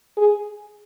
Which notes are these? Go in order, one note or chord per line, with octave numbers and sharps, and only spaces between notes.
G#4